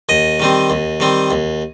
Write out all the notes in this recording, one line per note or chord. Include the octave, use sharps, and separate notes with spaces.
D#2 D#5
D#3 G3 C4
D#2
D#3 G3 C4
D#2